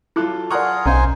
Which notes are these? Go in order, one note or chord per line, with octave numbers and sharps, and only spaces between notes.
F#3 E4 F4 A4 D6 F#6
F4 G#4 A#4 D5 F#5 A#5 C#6
B1 C#4 D#4 C5 F5 G#5